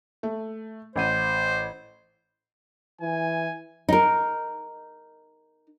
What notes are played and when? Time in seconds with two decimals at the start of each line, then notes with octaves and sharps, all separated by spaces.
0.23 A3
0.96 A1 C5 F#5 D#7
3.02 E3 G#5
3.89 D#4 A#4